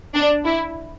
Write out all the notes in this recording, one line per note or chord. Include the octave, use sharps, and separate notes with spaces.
D4
E4